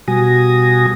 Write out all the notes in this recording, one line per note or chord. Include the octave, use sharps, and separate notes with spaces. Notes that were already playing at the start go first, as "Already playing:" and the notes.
B2 G3 F#4 G#5 D#6 A#6